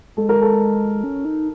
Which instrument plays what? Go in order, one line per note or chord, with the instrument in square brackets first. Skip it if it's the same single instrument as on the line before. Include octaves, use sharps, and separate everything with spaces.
[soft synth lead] G#3 [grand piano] A4
[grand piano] A#4
A4
[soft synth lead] C#4
D#4